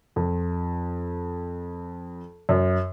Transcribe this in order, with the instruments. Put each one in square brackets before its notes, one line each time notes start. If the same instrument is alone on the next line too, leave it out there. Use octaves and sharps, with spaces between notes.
[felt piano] F2
F#2